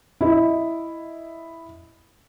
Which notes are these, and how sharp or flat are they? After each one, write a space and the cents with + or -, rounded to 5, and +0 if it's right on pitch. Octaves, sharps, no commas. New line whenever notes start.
E4 +0 D#5 +0